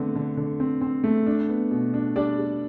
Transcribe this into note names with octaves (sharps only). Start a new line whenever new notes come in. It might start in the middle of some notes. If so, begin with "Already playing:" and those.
Already playing: D3 A3 B3 C4
D3
D3
C4
C4
A3
D4
B3
B2
D4
G3 D4 D5
G3